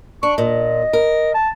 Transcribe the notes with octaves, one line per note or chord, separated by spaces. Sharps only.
D4 C#6
A#2 D#5
A#4
A5